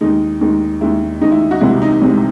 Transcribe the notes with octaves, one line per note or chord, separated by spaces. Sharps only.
D#2 D#3 G#3 D#4
D#2 D#3 G#3
D#2 D#3 G#3 E4
D#2 D#3 G#3 D#4
E4
D#4 F#4
C2 C3 E3 G#3 E4
D#4
C2 C3 E3 G#3